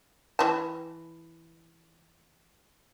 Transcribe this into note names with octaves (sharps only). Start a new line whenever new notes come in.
E3 A5